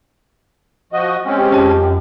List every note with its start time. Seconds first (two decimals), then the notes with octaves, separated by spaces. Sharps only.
0.93 F3 F#4 D#5
1.25 G#3 C4 C#4
1.38 G4
1.52 F2 D#5 A5
1.72 F#2